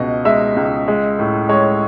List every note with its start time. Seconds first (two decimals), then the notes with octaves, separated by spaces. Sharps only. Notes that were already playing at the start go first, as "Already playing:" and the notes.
Already playing: C#2 B2 D#5
0.25 G#3 E5
0.56 C#2
0.88 G#3
1.19 A2
1.49 G#3 C#5